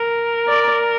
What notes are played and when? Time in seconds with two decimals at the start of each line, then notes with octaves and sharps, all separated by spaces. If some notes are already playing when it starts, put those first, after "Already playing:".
Already playing: A#4
0.48 D5